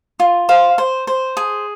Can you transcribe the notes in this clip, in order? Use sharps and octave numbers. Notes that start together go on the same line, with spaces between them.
F4
C5 F5
C5
C5
G#4